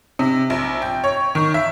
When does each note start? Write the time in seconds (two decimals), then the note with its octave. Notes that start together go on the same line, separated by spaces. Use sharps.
0.19 C3
0.50 A#1
0.82 G5
1.04 C#5
1.35 D#3
1.54 E5